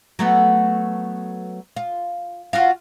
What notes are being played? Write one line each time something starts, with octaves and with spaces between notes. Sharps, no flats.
F#3 A3 B3
F4
F4 F#4 F5